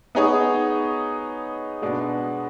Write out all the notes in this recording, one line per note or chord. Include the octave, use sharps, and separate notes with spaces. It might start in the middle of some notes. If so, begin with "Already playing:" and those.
B3 D#4 G#4 C#5
B2 G#3 B3 D4